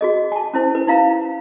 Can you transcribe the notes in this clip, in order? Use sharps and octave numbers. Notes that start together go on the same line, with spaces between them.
F#4 G#4 D#5
G#5 A5
C#4 E4 C5
B4
D#4 E4 F5 A#5